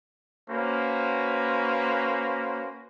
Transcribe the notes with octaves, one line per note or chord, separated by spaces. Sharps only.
A#3 C#4 F#4 B4 C5